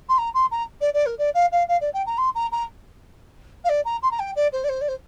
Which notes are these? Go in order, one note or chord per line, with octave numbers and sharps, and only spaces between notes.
C6
A#5
C6
A#5
D5
D5
A#4
D5
F5
F5
F5
D5
G5
A#5
C6
A#5
A#5
F5
D5
A#5
C6
A#5
G5
D5
C5
D5
C5
D5
C5